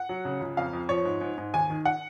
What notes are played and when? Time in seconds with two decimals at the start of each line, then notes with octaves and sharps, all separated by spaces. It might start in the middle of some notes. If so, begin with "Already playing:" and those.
Already playing: F#5
0.09 F#3
0.25 C#3
0.41 C#2
0.57 F2 F5
0.73 F2
0.89 F3 C#5
1.05 G#2
1.21 G#2
1.38 G#2
1.54 D#2 G#5
1.70 D#3
1.85 F#5